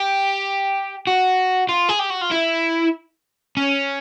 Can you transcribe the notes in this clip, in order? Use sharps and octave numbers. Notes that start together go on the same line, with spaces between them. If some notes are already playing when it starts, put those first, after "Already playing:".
Already playing: G4
F#4
F4
G#4
G4
F#4
F4
E4
C#4